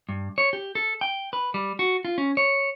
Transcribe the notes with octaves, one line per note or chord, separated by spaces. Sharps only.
G2
C#5
G4
A4
G5
B4
G3
F#4
F4
C#4
C#5